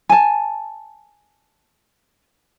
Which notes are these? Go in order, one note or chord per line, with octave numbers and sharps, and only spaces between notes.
G#5 A5